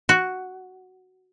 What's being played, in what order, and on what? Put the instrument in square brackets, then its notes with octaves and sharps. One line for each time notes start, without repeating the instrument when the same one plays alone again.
[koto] F#4